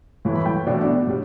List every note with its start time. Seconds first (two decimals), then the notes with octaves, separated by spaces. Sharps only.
0.25 A2 E3 A3
0.35 B5
0.46 G5
0.66 B2 A3 D4
1.07 A2 G3